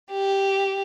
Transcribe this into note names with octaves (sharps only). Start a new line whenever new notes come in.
G4